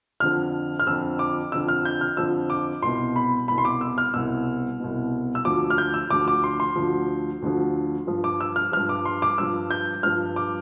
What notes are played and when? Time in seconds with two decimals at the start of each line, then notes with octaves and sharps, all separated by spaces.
0.20 F2 D3 F3 F6
0.80 F6
0.87 F2 D3 F3 E6
1.19 D6
1.52 F2 D3 F3 E6
1.68 F6
1.85 G6
2.01 F6
2.17 F2 D3 F3 E6
2.50 D6
2.83 C2 B2 C6
3.16 B5
3.48 C2 B2 B5
3.58 C6
3.65 D6
3.81 E6
3.98 F6
4.14 C2 B2 E6
4.80 C2 B2
5.35 E6
5.45 D2 D3 F3 D6
5.70 F6
5.78 G6
5.94 E6
6.10 D2 D3 F3 D6
6.28 D6
6.44 C6
6.60 C6
6.76 D2 D3 F3
7.42 D2 D3 F3
8.07 G2 F3
8.24 D6
8.41 E6
8.56 F6
8.72 G2 F3 F6
8.89 D6
9.05 C6
9.22 D6
9.38 G2 F3 E6
9.70 G6
10.03 G2 F3 F6
10.36 D6